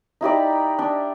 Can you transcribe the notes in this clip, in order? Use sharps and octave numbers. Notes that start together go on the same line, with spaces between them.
D#4 E4 G4 D5
D4